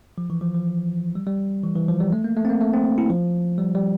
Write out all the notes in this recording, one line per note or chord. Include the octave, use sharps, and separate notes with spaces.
F3
E3
F3
F3
G3
G3
E3
E3
F3
G3
A3
A#3
A3
C4
A#3
A3
C4
E4
F3
G3
G3